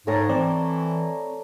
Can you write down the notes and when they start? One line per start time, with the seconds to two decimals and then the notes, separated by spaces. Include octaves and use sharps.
0.07 G#2 A3 C#5 A#5
0.29 E3 C4 D5